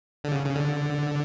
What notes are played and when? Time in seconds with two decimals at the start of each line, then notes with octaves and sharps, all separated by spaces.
0.24 D3
0.32 C#3
0.46 C#3
0.56 D3